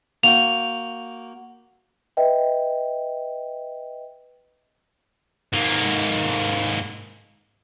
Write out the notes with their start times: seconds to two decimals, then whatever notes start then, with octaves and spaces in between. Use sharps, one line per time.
0.23 A#3 F#4 G5 F7
2.17 B4 D#5 E5 G5
5.53 G#2 A#3